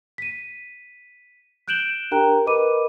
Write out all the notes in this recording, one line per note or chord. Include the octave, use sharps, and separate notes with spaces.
B6 D#7
F#6 G6 D7 E7 F#7 G7
D4 G4 A#4 G5 A#5 F#6
A#4 B4 D#5 B5 D6 D#7